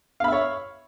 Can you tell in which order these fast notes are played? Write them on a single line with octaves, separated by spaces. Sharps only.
F5 B5 E5 C#5